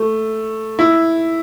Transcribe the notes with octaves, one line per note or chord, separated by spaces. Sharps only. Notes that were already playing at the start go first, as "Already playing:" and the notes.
Already playing: A3
E4